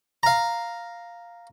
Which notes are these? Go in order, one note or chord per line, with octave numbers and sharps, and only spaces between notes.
F5 A#5